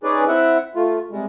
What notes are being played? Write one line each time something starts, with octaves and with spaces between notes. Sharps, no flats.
C#4 D#4 G#4 B4 D5
C4 E4 E5 F#5
A3 F4
C3 G3 G#3